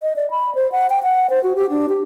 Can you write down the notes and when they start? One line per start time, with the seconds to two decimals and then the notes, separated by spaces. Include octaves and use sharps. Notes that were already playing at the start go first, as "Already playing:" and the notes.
0.02 D#5
0.16 D5
0.31 B5
0.55 C5
0.72 F#5
0.90 G5
1.03 F#5
1.30 C5
1.44 F#4
1.56 G4
1.70 D4
1.89 G4